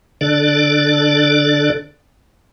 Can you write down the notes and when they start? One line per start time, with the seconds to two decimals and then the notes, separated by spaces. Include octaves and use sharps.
0.21 D3 D4 A4 D5